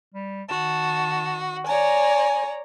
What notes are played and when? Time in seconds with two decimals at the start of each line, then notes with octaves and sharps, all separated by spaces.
0.14 G3
0.49 D#3 F#4 A5
1.66 C#5 D5 G#5 A#5